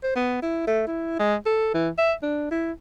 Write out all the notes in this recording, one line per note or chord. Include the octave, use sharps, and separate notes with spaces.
C5
B3
E4
A3
E4
G#3
A4
E3
E5
D4
E4